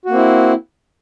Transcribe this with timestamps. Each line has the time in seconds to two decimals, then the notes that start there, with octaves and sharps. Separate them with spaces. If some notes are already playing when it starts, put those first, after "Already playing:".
0.06 F#4
0.09 A#3
0.13 C4
0.17 E4